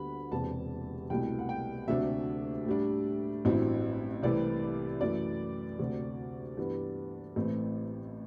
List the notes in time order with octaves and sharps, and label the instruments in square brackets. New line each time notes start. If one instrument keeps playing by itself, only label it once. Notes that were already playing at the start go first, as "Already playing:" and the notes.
Already playing: [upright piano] D2 D3 G3 B3 B5
E1 E2 C3 A5
C2 B2 A3 E4 G5
F#5
G5
D2 C3 F#3 A3 D4 E5
A2 G3 D4
A1 G2 F#3 C4 E4
C2 C3 E3 A3 E4 D5
F#2 E3 A3 E4 D5
D2 C3 F#3 A3
G2 E3 G3 B3 E4
A1 A2 E3 A3 C4